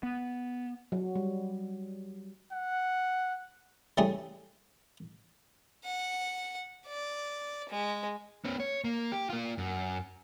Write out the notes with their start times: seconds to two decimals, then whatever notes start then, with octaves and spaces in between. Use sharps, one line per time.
0.03 B3
0.92 F#3
1.16 G3
2.52 F#5
3.97 E3 G3 A3 C#4 G#4
5.84 F#5
6.87 D5
7.69 G#3
8.45 B3 C#4
8.60 C#5
8.84 A#3
9.12 G4
9.30 A#3 F4
9.58 F#2